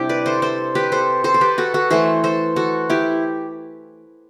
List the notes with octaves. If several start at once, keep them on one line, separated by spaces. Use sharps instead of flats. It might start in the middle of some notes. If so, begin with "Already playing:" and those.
Already playing: C3 G3 D4 E4 G4
B4 D5
A4 C5
A4 C5
G4 B4
A4 C5
A4 C5
A4
G4 B4
F#4 A4
F#4 A4
E3 A3 A4 C5
A4 C5
F#4 A4
E4 G4